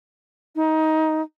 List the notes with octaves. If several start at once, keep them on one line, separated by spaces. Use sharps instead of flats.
D#4